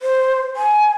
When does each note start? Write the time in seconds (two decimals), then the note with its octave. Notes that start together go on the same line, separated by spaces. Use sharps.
0.02 C5
0.56 G#5